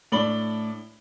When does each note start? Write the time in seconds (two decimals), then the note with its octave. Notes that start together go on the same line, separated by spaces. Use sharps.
0.12 A2 D4 D5 B5 F#7 G7